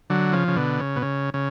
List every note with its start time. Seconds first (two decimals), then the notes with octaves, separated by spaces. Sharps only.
0.10 D3 F#3
0.33 C#3 F3
0.48 C#3
0.56 B2 D3
0.80 C#3
0.96 B2
1.02 C#3
1.34 C#3